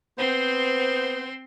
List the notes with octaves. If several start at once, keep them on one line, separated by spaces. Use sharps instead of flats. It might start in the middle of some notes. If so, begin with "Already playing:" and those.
B3 C4 C5 C6